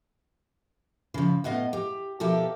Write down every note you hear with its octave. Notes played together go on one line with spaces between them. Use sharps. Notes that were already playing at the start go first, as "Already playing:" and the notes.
C#3 F3
A2 B3 D#5 F5
G4
B2 F3 G4 A4 A#4 E5